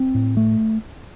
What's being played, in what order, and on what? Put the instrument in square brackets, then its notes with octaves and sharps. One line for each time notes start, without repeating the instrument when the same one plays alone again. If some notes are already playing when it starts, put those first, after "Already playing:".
Already playing: [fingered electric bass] C4
A2
A3